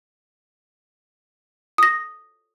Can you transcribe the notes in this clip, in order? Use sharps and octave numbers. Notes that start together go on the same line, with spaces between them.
D#6 A#6